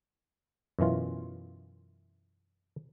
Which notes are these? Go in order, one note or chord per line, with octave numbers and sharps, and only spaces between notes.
F#2 B2 E3 F4